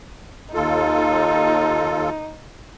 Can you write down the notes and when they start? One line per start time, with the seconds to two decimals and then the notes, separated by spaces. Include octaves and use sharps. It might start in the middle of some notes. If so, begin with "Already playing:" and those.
0.54 D#2 D#4 F4 A4